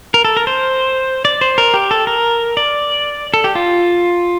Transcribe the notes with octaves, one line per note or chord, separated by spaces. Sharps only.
A#4
A4
A#4
C5
D5
C5
A#4
G4
A4
A#4
D5
A4
G4
F4